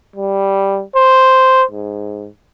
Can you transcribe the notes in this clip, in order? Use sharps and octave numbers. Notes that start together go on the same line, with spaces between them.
G3
C5
G#2